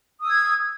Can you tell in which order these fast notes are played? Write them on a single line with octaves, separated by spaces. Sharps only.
D#6 E6 G#6